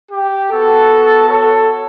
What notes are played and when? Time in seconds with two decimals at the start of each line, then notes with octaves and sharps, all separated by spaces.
0.12 G4
0.51 B3 F#4 A4
1.29 A4 C#5